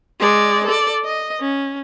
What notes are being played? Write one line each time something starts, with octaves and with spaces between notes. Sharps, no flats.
G#3 D5
A4 D5
D#5
C#4